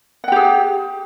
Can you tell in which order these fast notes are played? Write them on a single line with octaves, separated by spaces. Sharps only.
F#5 G5 G4 G#4